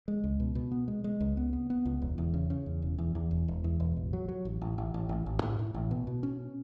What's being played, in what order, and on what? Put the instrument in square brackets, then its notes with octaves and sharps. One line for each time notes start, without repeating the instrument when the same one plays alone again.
[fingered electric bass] G#3
C#2
B2
B2
B3
G#3
G#3
C#2
B3
B3
B3
C#2
E1
E2
C#3
C#3
E2
E1
E2
E2
E1
E1
E2
E1
A1
F#3
F#3
A1
A1
A1
A1
A1
A1
A2
A2
A1
B2
B2
C#4